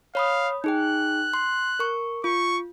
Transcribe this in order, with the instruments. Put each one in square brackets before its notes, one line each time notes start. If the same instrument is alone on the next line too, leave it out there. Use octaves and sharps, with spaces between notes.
[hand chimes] C#5 B5 D#6 [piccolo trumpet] F5
[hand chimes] D#4 G#4 G5 [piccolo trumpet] F#6
[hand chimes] C6
A#4 C#6
[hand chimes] F4 [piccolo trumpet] C#6